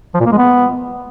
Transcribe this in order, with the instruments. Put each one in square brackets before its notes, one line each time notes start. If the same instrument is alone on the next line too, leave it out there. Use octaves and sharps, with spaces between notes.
[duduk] F3
A#2
A#3
G#3
B3